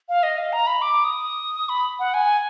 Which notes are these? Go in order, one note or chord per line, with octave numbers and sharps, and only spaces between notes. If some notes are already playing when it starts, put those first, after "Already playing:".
F5
D#5
F5
A#5
B5
D6
D#6
B5
F#5
G#5